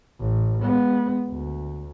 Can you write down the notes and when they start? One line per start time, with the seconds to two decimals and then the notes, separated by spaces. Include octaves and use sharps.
0.20 A1
0.61 G#3 B3
1.31 D2